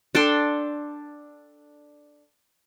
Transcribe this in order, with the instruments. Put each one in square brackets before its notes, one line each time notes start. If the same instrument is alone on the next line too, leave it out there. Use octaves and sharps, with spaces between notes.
[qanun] D4 A4 G5 C6